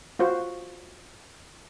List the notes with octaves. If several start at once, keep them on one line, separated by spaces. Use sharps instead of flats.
F4 F#4 C5